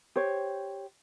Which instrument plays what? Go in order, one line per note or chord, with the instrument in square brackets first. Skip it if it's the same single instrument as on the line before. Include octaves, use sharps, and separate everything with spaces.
[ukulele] G4 C5 C#5